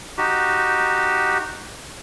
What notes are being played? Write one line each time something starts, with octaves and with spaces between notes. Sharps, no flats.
D#4 F#4 G4